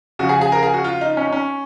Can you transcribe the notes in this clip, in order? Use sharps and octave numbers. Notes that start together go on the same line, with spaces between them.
C#3 F3 F#4
G#4
G#4
A#4
G#4
F#4
F4
D#4
C#4
D#4
C#4